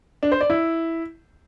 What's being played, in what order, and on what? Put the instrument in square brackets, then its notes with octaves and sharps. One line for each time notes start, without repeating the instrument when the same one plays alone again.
[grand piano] D4
C5
D5
E4